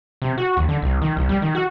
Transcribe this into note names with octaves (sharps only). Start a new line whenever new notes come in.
C3
F#4
D#2
D3
C2
D#3
C2
G3
D#3
F#4